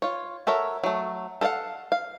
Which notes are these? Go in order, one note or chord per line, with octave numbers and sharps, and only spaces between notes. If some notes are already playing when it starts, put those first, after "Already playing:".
F4 C#5
F#4 A4 A#4 C#5 E5
F#3 A3
A4 A#4 D5 F5 F#5
F5